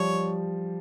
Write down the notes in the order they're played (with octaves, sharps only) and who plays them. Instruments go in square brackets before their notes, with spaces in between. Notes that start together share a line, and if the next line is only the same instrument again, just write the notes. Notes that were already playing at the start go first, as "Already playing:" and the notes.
Already playing: [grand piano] F3 G3 [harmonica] C#5